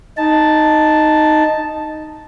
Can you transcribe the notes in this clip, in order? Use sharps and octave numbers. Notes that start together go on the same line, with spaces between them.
D#4 A5